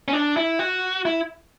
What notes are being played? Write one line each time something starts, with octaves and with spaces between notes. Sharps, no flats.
C#4
D4
E4
F#4
E4